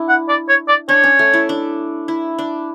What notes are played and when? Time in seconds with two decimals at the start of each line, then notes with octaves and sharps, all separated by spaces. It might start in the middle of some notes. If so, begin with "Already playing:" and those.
Already playing: D4 E4
0.09 F#5
0.29 D5
0.49 C#5
0.68 D5
0.89 D4 C#5
1.04 C#4
1.19 A3
1.34 E4
1.49 D4
2.08 E4
2.39 D4